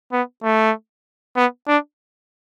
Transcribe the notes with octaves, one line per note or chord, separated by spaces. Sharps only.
B3
A3
B3
D4